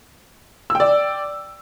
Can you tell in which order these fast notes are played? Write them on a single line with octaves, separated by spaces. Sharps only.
E6 G5 D5